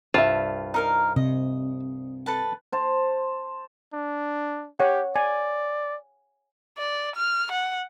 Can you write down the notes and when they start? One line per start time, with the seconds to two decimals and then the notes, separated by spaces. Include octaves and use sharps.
0.14 C2 G2 F4 E5 A5
0.74 D#4 A#4 F5
1.16 C3 D#5
2.26 A4 B4 A5
2.72 C5 A5
3.94 D4
4.80 G4 C#5 F#5
5.16 D5 G#5
6.78 D5
7.16 F6
7.52 F#5